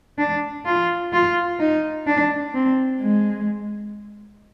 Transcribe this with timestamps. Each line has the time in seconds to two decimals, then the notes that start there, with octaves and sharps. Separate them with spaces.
0.18 D4
0.65 F4
1.13 F4
1.59 D#4
2.07 D4
2.54 C4
3.01 G#3